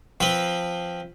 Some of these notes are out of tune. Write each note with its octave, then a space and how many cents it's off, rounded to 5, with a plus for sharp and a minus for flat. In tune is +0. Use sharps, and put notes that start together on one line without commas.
F3 +0 C4 +0 B4 +0